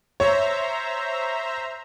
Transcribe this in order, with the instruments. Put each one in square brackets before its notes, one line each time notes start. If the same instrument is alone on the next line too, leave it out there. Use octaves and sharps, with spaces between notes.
[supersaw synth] C5 E5 A#5 [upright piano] C#5